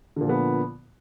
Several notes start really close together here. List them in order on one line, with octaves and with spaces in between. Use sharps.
D3 A#2 F3 B3